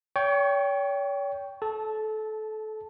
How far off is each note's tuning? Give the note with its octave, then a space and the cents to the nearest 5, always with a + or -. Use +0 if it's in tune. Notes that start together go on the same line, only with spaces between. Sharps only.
C#5 +40 G5 +0 C#6 +0
A4 -25 A5 +0